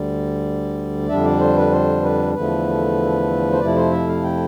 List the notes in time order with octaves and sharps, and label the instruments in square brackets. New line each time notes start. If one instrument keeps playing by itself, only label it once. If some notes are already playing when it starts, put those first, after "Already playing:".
Already playing: [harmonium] D2 D3 G3 D5
F2 D3 G3 D4 E5
D5
C5
B4
C5
B4
E2 D3 F3 A3 B4
C5
F2 C3 F3 A3 E4 D5
C5
E5
F5
G5